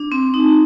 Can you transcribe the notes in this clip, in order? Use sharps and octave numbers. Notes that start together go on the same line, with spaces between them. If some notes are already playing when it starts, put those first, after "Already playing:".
Already playing: D4
C4
D#4